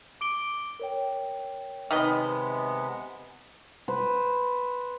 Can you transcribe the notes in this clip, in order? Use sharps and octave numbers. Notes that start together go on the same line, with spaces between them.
D6 D7 G7
A#4 C#5 G5
C3 D#3 G#3 B3 B4 D#5
B4 C5